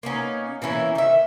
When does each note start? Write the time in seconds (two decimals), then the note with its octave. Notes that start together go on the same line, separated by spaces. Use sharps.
0.03 A#3 B3 C#4 D#4
0.62 E3 A#3 C#4 E4
0.95 D#3 E5